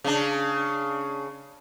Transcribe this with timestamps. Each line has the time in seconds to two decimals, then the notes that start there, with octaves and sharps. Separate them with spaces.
0.04 C#3 D4